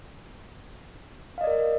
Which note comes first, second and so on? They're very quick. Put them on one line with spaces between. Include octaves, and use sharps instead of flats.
F5 D#5 D5 A#4